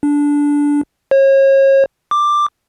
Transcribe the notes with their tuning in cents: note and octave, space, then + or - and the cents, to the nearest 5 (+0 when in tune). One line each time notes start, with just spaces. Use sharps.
D4 -15
C#5 -35
D6 +10